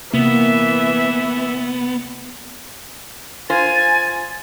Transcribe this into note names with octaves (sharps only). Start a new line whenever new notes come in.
C3 E3 A#3 B3 E5
F4 C5 G#5 A6